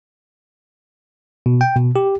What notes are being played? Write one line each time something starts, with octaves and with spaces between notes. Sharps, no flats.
B2
G5
B2
G4